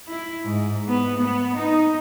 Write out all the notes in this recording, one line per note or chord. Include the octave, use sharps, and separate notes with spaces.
E4
G#2
B3
B3
D#4